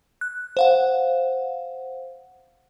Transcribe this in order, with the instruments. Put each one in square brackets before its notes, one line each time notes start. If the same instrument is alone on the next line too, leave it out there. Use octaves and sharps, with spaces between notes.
[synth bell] F#6
C5 F5 F#5